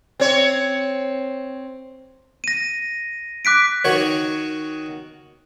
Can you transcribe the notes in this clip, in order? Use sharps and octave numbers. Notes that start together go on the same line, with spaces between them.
C4 C#5
A#6 D#7
D6 F#6 B6 D7
D#3 F#4 C#5